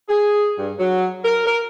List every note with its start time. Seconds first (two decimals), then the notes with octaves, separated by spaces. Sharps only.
0.08 G#4
0.58 G2
0.78 F#3
1.24 A#4
1.45 A#4